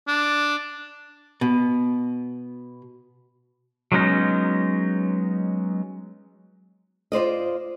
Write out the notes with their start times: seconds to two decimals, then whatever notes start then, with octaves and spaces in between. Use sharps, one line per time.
0.08 D4
1.41 B2
3.92 F#3 G#3 B3 C#4 D#4
7.12 F4 C5 D5 D#5